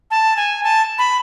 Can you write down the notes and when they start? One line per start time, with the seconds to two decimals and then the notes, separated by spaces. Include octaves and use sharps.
0.11 A5
0.37 G#5
0.64 A5
0.98 B5